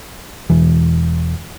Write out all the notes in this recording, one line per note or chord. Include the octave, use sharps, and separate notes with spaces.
E1 E3